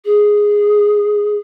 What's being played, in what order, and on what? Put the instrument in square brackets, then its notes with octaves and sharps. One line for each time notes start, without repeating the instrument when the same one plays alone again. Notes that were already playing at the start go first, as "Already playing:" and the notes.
[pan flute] G#4